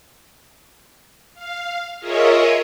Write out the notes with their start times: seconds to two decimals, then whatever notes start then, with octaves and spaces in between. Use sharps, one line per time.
1.34 F5
1.99 F4 G#4 A#4 C#5 D#5 E5